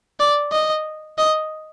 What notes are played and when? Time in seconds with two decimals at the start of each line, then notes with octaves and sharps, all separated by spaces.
0.20 D5
0.52 D#5
1.18 D#5